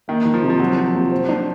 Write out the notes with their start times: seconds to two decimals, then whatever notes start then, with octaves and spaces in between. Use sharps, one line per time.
0.08 D#3 A#3
0.25 D#3
0.34 F3
0.43 C3
0.50 F3
0.60 C3 F#3
0.77 F3
0.95 C3
1.11 C5
1.29 D4